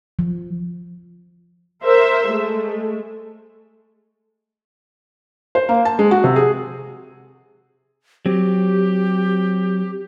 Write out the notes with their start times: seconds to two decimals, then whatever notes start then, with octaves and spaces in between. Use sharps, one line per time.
0.19 F3
1.84 A#4 C5 E5
2.29 G#3 A3
5.55 C5
5.69 A#3
5.85 A5
5.99 G#3
6.11 F#4
6.24 C3
6.36 G#4
8.26 F#3 C4 G4